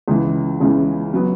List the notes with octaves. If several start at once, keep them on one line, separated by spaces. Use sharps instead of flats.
C#2 C#3 E3
C#2 C#3 E3
F#3 B3